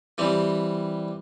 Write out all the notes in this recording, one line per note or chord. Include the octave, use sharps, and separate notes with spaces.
E3 G3 C4